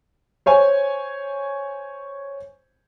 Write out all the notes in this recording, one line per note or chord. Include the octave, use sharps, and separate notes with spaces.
C5 C#5 G#5